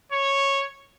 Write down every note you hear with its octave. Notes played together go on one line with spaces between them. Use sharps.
C#5